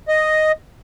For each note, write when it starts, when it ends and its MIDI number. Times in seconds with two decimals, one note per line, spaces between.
0.08 0.52 75